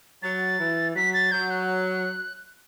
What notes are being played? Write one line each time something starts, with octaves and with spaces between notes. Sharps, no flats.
F#3 A6
E3
F#3 B6
A6
F#3 G6
F#6